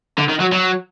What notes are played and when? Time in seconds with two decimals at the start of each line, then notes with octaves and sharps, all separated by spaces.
0.18 D3
0.29 D#3
0.40 F#3
0.52 F#3